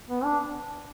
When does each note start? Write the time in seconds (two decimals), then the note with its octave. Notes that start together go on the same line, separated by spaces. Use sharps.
0.09 B3
0.24 D4